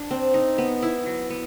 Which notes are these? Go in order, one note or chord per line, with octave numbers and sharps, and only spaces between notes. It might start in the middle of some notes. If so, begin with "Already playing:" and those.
Already playing: D4
C4
D#4
B3
E4
F#3
B3